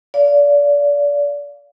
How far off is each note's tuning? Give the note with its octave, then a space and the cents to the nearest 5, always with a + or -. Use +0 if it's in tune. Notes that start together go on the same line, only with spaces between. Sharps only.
D5 -25 F5 +0